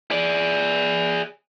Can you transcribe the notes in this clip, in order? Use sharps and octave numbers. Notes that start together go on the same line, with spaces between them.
G#4 D5